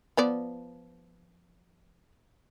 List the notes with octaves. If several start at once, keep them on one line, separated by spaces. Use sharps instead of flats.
F3 B3 D5